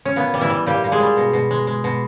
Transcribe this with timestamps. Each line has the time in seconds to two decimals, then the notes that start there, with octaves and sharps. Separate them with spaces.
0.05 C#4
0.16 A#2 B3
0.34 G3
0.41 E3 E4
0.50 G3
0.67 A#2 G3 G4
0.84 A#2
0.92 G#3 G#4
1.00 G3
1.17 B2
1.33 B2
1.51 G#3
1.67 G#3
1.84 B2